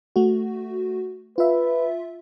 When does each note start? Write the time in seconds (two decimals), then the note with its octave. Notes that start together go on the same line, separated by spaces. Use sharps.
0.16 A3 F#4
1.38 F4 B4 E5